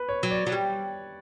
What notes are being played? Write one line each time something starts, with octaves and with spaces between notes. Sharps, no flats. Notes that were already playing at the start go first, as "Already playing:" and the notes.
Already playing: B4
C#5
F#3
D5
F#3
G3